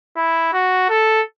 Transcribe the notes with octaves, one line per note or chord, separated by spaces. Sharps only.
E4
F#4
A4